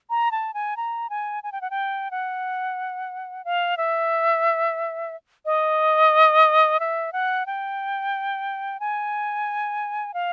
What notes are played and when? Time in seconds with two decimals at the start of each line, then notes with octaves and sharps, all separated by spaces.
0.10 A#5
0.32 A5
0.54 G#5
0.77 A#5
1.10 G#5
1.43 G#5
1.52 G5
1.61 F#5
1.71 G5
2.11 F#5
3.45 F5
3.77 E5
5.45 D#5
6.80 E5
7.13 F#5
7.46 G5
8.80 G#5
10.14 F5